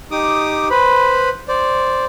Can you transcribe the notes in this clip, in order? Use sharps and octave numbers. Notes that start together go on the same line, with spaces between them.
D#4 G4 D6 D#6
B4 C5 B5
C5 D5